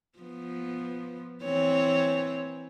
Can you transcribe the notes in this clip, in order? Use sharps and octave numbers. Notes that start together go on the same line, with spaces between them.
F3 B3
E3 C4 C#5